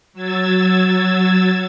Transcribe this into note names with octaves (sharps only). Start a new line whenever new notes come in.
F#3 E6 G#6 A6